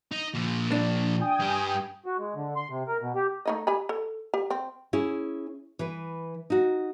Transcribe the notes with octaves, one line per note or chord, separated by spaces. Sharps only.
D#4
A#2 F3
D4
G5 G#5 D#6
G2 G4
F#4
G#3
D3
C6
C3
A#4
B2
G4
A3 D#4 D#5
G4 G#5 B5
A4
G4
C4
C#4 E4 G#4
E3 B4
D#4 F#4